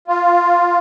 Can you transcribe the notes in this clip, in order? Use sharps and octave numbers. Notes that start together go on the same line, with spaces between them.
F4